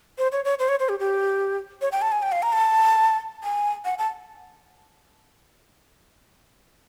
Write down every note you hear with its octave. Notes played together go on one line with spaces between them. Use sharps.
C5
C#5
C#5
C5
C#5
C5
G4
G4
C#5
G5
A5
G#5
G5
F5
A#5
A5
G#5
F#5
A5